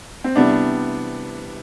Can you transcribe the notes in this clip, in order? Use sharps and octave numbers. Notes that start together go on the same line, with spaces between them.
C4
C3 E3 G3 B3 D4